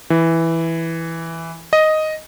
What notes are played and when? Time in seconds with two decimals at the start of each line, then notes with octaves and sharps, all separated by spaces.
0.10 E3
1.73 D#5